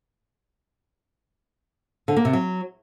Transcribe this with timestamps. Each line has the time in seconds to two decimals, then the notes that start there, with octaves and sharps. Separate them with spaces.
2.08 D3
2.16 A#3
2.25 C3
2.33 F#3